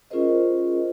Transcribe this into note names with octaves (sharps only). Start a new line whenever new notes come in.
C#4 F4 G#4 A#4 C5 D#5